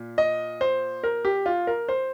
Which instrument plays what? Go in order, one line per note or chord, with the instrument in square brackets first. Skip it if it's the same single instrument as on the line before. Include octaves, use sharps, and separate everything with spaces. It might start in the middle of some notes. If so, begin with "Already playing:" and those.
Already playing: [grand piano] A#2
D#5
C5
A#4
G4
F4
A#4
C5